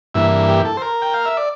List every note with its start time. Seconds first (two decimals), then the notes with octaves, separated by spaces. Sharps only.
0.15 G2 E3 A#3 E4 E5
0.49 G4
0.65 A4
0.77 C5
0.82 A#4
1.02 G5
1.14 F5
1.26 E5
1.37 D5